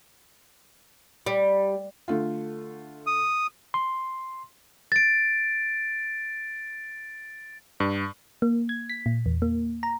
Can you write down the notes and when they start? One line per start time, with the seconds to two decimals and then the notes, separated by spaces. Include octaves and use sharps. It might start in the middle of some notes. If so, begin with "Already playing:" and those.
1.26 G3
2.08 D3 A3 F4
3.07 D#6
3.74 C6
4.92 A6 D7
7.80 G2
8.42 A#3
8.69 G#6
8.89 B6
9.06 A#2
9.26 E2
9.42 A#3
9.83 A#5